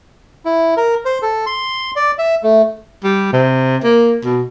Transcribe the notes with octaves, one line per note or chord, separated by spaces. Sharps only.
E4
A#4
C5
A4
C6
D5
E5
A3
G3
C3
A#3
B2